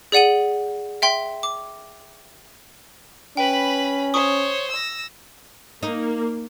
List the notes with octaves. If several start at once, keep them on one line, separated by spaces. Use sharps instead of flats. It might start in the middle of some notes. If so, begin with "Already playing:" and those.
G#4 D5 F#5 D#7 F#7
E5 G5 C6
D6
C#4 B4 G5 B5
C5 C#5 C#6 D#6
E6 A#6
A#3 D#4